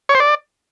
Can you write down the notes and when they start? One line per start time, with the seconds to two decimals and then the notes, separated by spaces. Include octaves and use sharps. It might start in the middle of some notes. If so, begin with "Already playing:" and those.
0.09 C#5
0.15 C5
0.20 D5